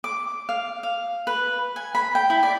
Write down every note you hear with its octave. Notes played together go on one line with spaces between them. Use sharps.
D6
F5
F5
B4
G#5
B5
G5
E4
D5